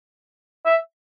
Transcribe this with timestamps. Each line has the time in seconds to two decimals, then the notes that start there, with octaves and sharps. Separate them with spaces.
0.66 E5